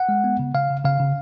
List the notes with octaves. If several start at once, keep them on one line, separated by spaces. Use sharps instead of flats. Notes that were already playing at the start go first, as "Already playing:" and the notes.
Already playing: F#5
G#3
B3
C#3
C#3 F5
C#3
C#3 F5
C#3